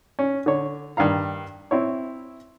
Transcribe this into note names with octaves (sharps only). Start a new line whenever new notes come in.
C#4
D3 C#5
G2 D#3 F5 A#5
C4 E4 C#5